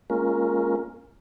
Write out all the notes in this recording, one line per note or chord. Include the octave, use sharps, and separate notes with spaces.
G#3 A#3 C#4 F4 A#4